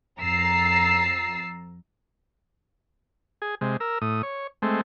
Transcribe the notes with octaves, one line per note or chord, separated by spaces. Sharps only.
F2 A#5 E6 A6 C7
G#4
C3 G#3
A#4 E6
A2 D#6
C#5
G#3 A3 C4